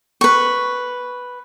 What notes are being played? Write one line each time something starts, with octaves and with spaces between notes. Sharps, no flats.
B4 C#6